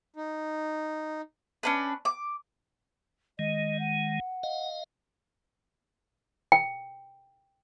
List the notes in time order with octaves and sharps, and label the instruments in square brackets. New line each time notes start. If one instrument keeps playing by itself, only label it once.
[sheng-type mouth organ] D#4
[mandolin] C#4 D4 B4
D6
[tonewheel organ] D#3 G#3 [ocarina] D#5
[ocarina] F#5
[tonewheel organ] D#5 F5
[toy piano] G5